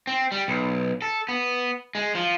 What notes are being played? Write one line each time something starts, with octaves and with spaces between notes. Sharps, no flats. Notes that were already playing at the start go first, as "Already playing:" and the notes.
C4
G3
B1
A4
B3
G#3
F3